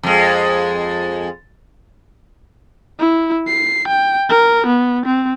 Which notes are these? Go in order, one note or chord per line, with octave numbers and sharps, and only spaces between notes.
F2 G#3
E4
C7
G5
A#4
B3
C4